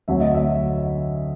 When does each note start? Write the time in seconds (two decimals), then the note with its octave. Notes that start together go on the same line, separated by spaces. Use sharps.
0.08 D2 D3 F#3 E5
0.21 D#5
0.34 E5